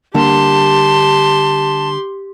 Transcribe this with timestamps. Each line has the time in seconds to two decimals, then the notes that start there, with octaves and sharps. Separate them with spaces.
0.15 D3 G3 A#3 G4 A5 C6